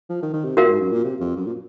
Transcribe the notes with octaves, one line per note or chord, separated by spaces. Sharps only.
F3
D#3
D#3
C3
A#2 F#4 A#4 F5
G#2
F#2
A#2
C3
F2
F#2
A#2